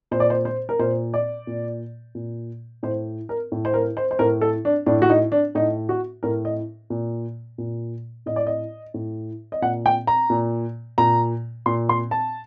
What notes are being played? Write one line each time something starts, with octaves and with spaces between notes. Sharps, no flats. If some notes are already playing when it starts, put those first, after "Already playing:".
A#2 C5
D5
C5
C5
A#4
A#2 C5
D5
A#2
A#2
A2 C5
A#4
A2
C5
A#4
C5
C5
A2 A#4
A4
D4
A2 D4
F#4
D#4
D4
A2 D#4
F#4
A2 A#4
D#5
A#2
A#2
A2 D#5
D5
D#5
A2
D#5
A#2 F#5
G5
A#5
A#2
A#2 A#5
A#2 C6
C6
A5